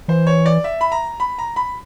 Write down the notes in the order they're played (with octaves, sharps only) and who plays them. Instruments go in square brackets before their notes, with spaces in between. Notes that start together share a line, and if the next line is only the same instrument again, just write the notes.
[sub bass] E3 [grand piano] C5
[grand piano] C#5
D5
E5
B5
A#5
B5
A#5
B5